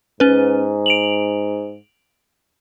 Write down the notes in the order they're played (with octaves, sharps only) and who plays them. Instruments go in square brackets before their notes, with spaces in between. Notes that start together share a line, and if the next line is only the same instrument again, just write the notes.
[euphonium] G#2 [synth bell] C#4 B4
[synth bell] D7 F7 F#7